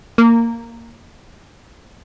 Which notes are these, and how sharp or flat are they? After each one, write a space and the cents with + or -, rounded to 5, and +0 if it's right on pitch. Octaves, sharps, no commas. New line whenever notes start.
A#3 -10